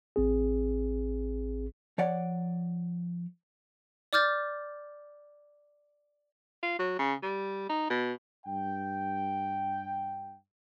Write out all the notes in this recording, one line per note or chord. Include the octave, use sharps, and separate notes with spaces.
A1 C4 G#4
F3 C#5 D5 F#5
D5 D6 F6 G6 A6
F4
F#3
C#3
G3
D#4
B2
G2 G5